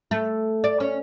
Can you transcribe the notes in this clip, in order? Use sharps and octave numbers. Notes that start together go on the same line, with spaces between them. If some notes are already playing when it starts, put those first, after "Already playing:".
A3
D5
C#4